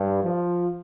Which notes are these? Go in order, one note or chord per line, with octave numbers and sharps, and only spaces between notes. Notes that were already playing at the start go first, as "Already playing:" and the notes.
Already playing: G2
F3